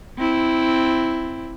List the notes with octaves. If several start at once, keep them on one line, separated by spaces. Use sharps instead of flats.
C4 E4